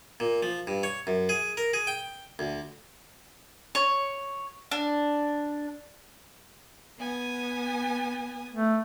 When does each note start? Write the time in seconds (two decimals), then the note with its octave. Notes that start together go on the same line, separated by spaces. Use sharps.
0.20 A#2
0.43 F3
0.67 G2
0.83 C#5
1.07 F#2
1.29 G#4
1.57 A#4
1.73 G#4
1.87 G5
2.39 D2
3.75 C#5
4.71 D4
6.99 B3 G#5 D#6
8.53 A3